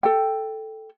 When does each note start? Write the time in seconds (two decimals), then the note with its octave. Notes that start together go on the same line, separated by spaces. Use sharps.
0.03 A4 G5